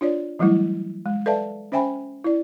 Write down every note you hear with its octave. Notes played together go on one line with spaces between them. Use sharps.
D4 F4 C#5 D5
E3 F#3 G3 A3 E4
G#3
A4 B4 D5 E5 F5 A5
C#4 C5 E5 G5 G#5 B5
E4 D5